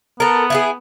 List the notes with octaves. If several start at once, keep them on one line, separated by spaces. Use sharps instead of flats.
B3 A4 A#4
E4 F4 G#4